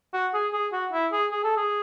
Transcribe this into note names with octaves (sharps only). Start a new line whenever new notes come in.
F#4
G#4
G#4
F#4
E4
G#4
G#4
A4
G#4